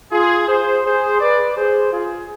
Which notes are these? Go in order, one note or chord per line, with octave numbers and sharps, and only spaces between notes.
F4 G#4
G#4 C5
G#4 C5
B4 D5
G#4 C5
F4 G#4